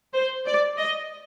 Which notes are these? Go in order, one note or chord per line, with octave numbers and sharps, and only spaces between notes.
C5
D5
D#5